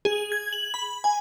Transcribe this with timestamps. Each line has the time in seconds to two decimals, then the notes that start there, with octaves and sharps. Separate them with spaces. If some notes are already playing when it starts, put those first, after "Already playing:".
0.05 G#4
0.32 G#6
0.53 F#7
0.74 B5
1.04 G#5